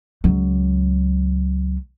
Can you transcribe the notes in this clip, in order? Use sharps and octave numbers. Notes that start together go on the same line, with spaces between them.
C#2 F#3